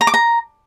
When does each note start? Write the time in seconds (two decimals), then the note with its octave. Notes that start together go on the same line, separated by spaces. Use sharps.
0.01 A#5
0.07 D6
0.14 A#5